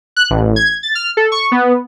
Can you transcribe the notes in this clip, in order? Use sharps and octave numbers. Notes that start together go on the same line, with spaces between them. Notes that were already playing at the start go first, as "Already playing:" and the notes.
F#6
A1
G#6
A6
F6
A4
C#6
B3